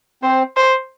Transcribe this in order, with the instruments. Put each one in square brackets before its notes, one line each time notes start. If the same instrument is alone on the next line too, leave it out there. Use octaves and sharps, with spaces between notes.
[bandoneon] C4 [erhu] C5
[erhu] C5